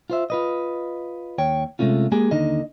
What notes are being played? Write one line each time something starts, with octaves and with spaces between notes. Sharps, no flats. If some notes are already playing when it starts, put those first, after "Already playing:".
F4 C5 E5
F4 B4 D#5
D#2 C#5 G5
C3 G#3 A3 C#4 F4
G#3 A#3 G4 G#4 G#5
D#2 D3 D#4 D#5